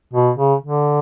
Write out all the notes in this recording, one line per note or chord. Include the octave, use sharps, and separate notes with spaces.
B2
C#3
D3